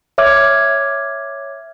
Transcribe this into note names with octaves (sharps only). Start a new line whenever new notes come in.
C#5 E5 D6 F6 G#6